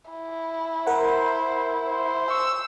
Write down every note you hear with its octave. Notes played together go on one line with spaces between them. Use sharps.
E4
A#4 C5 F#5
C5
C#6 E6